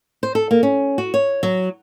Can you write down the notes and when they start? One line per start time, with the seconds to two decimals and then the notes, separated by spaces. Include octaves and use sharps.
0.23 C5
0.35 A4
0.51 A#3
0.63 C#4
0.98 F#4
1.14 C#5
1.43 F#3